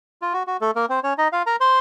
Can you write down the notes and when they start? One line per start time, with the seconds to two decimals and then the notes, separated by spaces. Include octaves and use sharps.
0.22 F4
0.33 F#4
0.47 F#4
0.61 A3 A4
0.75 A#3 A#4
0.89 C4 C5
1.03 C#4 C#5
1.18 D#4 D#5
1.32 F4 F5
1.46 A#4 A#5
1.60 C5 C6